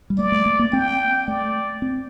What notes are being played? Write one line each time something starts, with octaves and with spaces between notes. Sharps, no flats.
G3
A3 D5
A3
A3
A#3
C4 G5
A3 D5
C4